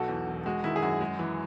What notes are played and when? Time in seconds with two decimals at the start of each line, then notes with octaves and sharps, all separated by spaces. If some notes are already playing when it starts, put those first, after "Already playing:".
Already playing: B1 B2 F#4 A4
0.08 E2
0.27 E1
0.46 G#3 F#4
0.64 D#3 E4
0.76 G#4
0.82 F#2 F#4
1.01 G#3
1.19 E3